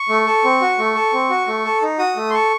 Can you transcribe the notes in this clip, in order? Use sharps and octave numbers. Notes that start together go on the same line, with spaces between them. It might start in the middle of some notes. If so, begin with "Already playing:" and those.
Already playing: C#6
A3
A4
C4
F#4
A3
A4
C4
F#4
A3
A4
D#4
F#4 D#6
A3
C6
A4 C#6